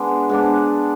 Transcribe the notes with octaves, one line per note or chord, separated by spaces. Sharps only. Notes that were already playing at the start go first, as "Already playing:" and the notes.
Already playing: G#3 B3 D4
G#3 B3 D4